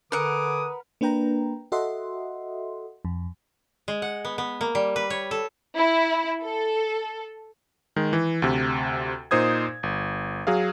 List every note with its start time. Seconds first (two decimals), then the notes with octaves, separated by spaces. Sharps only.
0.12 D3 A#4 B4 F#5 G#5 D6 D#6
1.01 A#3 D4 B4 G5 A#5
1.72 F#4 A4 D#5 E5 F#5 C6
3.05 F2
3.88 G#3
4.02 F#5
4.25 B3
4.38 B3
4.61 A#3
4.75 G3
4.96 B4
5.10 C#5
5.31 A4
5.76 E4
6.42 A4
7.96 D#3 G#3
8.13 E3
8.42 D2 C3
9.31 A#2 D#4 C5 D#6 G#6
9.83 G1
10.47 F#3 G#4 F5